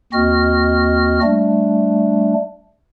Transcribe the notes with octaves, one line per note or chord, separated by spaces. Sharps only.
D#2 C4 F#4 D#5 F6
G3 A3 D4